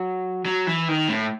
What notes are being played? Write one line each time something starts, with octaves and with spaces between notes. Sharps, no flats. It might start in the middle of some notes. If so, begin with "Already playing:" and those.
Already playing: F#3
F#3
E3
D#3
A2